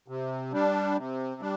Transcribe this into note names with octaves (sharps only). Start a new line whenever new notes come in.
C3
G3 D4
C3
G3 D4